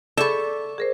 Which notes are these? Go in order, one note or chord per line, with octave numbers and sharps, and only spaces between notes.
G#4 A4 D5 E5 B5 C#6 D6 A6
G#4 A#4 C5